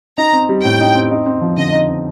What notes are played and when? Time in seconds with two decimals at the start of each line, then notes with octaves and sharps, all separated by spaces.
0.18 D#4 A#5
0.33 C4
0.49 G3
0.64 A2 G5
0.80 D#4
0.95 C4
1.11 D#4
1.26 C4
1.41 F3
1.57 D3 D#5
1.72 D#4
1.88 C4